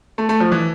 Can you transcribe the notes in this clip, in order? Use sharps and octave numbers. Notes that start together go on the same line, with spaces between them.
A3
A3
F3
E3